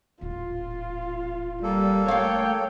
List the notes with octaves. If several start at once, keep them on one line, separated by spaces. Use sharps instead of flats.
D#1 A1 F4
G3 A#3 A4
A3 C#5 F5 G5